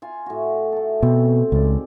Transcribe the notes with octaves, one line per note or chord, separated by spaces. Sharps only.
F4 G#5
A2 F#4
A3 A4
B2 C4
C#2 G#2 D5